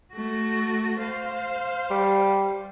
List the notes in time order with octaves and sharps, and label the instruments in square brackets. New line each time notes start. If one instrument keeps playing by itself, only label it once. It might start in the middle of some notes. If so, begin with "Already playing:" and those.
[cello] A3 F#4
C5 F5
[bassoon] G3